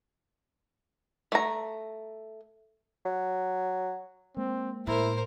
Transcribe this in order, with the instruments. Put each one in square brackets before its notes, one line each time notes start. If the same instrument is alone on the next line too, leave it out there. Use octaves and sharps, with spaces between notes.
[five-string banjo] A3 A#5
[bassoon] F#3
[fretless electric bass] G#3 A#3 [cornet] C4
[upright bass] A2 [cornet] E4 [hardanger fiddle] A#4 C5